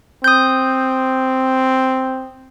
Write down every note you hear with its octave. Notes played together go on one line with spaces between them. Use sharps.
C4 D#6 G6